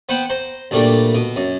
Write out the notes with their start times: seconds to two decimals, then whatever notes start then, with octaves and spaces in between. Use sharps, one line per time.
0.09 B3 C5 F#5 G5
0.30 C5 A#5 C6
0.71 D2 A#2 G3 A3 D4
1.15 B2
1.36 F#2